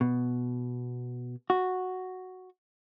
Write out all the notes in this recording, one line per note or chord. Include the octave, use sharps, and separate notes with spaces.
B2
F#4